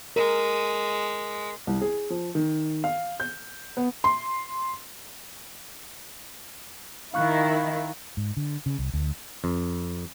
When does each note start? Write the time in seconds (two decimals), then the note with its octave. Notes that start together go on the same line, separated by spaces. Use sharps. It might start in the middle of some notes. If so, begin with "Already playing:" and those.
0.16 G#3 A#4
1.67 C2
1.81 G#4
2.10 F3
2.35 D#3
2.84 F5
3.20 G6
3.77 B3
4.04 C6
7.14 D#3 E4 F5 C#6 F#6
8.17 G#2
8.37 D3
8.66 C#3
8.79 C2
8.94 D2
9.44 F2